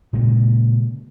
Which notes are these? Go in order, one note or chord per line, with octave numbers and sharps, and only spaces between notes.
A#2 C#3 G#3